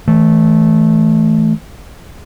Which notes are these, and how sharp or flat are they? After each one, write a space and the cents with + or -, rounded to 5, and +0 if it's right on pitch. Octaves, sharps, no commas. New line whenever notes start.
E3 -25 A3 -10